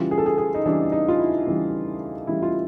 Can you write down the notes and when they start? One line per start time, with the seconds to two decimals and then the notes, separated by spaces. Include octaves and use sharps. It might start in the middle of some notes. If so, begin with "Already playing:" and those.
Already playing: C#3 E3 G3 F4
0.11 G#4
0.18 A4
0.26 G#4
0.38 G#4
0.54 D#4
0.66 C#3 E3 G3 D4
0.92 D#4
1.08 F4
1.19 E4
1.47 C#3 E3 G3
2.27 C#3 E3 G3 E4
2.43 F4